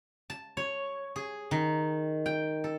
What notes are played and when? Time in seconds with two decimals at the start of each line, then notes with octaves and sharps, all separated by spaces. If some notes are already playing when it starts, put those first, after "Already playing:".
0.30 A5
0.57 C#5
1.16 G#4
1.51 D#3
2.26 G5
2.64 A4